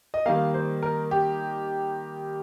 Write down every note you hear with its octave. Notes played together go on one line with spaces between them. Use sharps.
D#5
D#3 G3 A#3 F5
C5
A#4
G4